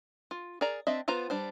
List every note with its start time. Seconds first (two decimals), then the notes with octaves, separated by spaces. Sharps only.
0.31 F4
0.61 G#4 A#4 D5 A#5
0.87 C4 D4 D#5 E5
1.08 B3 F4 C5 A#5
1.30 G3 D4 C5